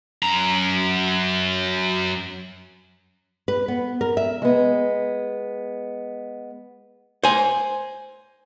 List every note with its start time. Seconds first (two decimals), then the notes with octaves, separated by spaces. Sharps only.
0.23 F#2 A#5
3.48 B4
3.68 B3
4.01 A#4
4.17 E5
4.42 G#3 B3
7.24 C5 G#5